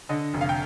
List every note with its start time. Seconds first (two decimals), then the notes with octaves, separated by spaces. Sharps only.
0.09 D3 D#5
0.34 F1
0.41 F5
0.49 G5